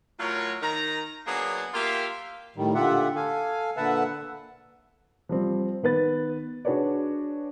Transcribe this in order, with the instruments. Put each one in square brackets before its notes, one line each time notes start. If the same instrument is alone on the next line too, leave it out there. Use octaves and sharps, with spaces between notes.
[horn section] A2 F#3 F4 A#4 C#5
D#3 A#5
F#3 A#3 B3 D4 G#4
A#3 F4 G4 E5 F5 G5
[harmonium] A2 D#3 G3
A#2 D3 F4 G4 E5 F#5
A4 F5 G#5
A#2 D3 B4 E5 F#5 A5
[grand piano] F3 G3 C4
D#3 B3 B4 A6
D4 F#4 G#4 B4 C#5 D5